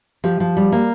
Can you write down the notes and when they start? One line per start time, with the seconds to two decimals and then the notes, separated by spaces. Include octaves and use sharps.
0.24 F3 G4
0.40 F3
0.57 G3
0.72 A#3